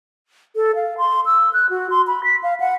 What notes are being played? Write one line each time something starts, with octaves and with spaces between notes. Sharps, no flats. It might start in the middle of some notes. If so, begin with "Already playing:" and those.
A4
F5
C6
E6
F#6
F#4
C6
B5
B6
F5
F#5